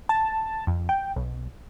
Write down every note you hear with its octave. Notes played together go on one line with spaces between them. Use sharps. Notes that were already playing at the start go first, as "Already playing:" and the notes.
A5
F2
G5
B1